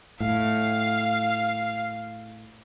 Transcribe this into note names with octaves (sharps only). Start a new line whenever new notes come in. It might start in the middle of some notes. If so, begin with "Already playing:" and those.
A2 F5